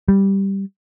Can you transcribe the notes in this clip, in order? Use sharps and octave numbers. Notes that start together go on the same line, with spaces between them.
G3